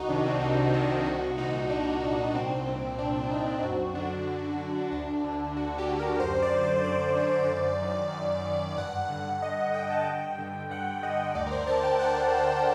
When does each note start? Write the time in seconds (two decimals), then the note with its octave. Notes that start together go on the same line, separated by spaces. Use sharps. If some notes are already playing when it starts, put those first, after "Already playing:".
Already playing: C2 D#4 F#4
0.09 C3 D#3 D4
0.26 C4
0.41 C2 D4
0.74 C3 D#3 D#4
1.06 C2 F#4
1.37 A#2 D#4
1.69 C2 D4
2.02 A#2
2.34 C2 C4
2.66 A#2
2.98 C2 D4
3.31 A#2 D#4
3.63 F#2 F#4
3.95 D3 D4
4.28 F#2
4.60 D3
4.92 D2 D4
5.24 D3
5.57 D2 F#4
5.78 G4
5.89 D3
6.00 A#4
6.20 F#2 C5
6.42 D5
6.53 D3
6.63 C5
6.84 F#2 D5
7.16 D3
7.49 F#2
7.81 D#3
8.14 F#2
8.45 D#3
8.77 G2 F#5
9.10 D3
9.33 F#5
9.42 G2 D#5
9.58 F#5
9.74 D3 G5
9.90 A5
10.07 G2 G5
10.39 D3
10.70 G2 F#5
11.02 D3 D#5
11.35 D2 D5
11.47 A#4
11.52 C5
11.67 D3 A5
11.83 G5
11.99 D2 F#5
12.31 D3